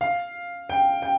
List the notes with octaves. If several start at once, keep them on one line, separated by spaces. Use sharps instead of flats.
F5
G5
G5